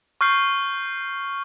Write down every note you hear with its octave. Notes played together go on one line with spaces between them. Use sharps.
C#6 F6 G6 C7